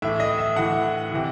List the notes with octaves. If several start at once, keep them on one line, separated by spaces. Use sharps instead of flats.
A2 E3 E5
D#5
E5
A2 E3 F#5
C3 E3